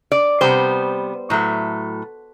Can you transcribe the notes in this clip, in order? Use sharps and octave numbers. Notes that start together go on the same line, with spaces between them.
D5
C3 G3 B3 C5
A2 F#3 A3